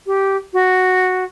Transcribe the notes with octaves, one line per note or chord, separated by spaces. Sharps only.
G4
F#4